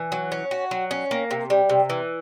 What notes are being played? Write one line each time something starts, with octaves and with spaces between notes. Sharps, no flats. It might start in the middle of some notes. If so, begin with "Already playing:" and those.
Already playing: E3
F#3
C#4
F#4
F#3
C#4
A#3
C3
G3
C3
E3